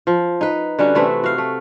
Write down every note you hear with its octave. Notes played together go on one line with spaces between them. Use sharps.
F3
D#4 B4
D3 G3 C#4 F#4
C3 E3 A3 E4
F#4 F5
A3